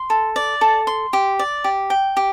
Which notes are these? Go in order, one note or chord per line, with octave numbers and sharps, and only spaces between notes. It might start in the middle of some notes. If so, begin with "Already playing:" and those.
Already playing: C6
A4
D5
A4
C6
G4
D5
G4
G5
G4